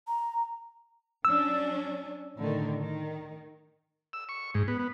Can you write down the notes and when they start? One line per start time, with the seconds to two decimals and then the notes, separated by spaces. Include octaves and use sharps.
0.08 A#5
1.25 F#3 C#4 D4 E6
2.37 A2 D3 D#3
2.81 D#3
4.13 E6
4.29 C#6
4.55 G#2
4.68 B3
4.79 B3